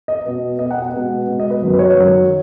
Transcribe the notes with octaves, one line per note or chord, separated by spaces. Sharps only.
D#5
B2 B3
B2 B3 D#5
F#5
F#5
B2 G#3 B3
B2 G#3 B3
D#5
B4
F#2 D#3 F#3
B4
C#5
F#2 D#3 F#3